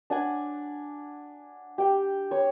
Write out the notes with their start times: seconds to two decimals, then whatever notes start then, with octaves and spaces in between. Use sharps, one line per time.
0.10 D4 F#5 G#5
1.78 G4 G5
2.31 C#5